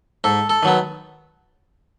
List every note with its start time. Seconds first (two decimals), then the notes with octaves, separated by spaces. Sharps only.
0.24 G#2 A4
0.50 A4
0.63 D#3 F#3 B3